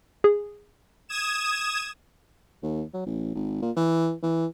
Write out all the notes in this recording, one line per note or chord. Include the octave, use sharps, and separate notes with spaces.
G#4
D#6 G#6 E7
D#2
F#3
A1
G#1
A#2
E3
E3